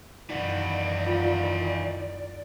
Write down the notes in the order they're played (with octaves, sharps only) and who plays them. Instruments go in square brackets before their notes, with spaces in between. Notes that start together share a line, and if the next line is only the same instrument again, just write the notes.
[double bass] F#2 D#3 [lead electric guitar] E3 F#4 [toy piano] D#4 [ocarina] D5
[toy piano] F4 F5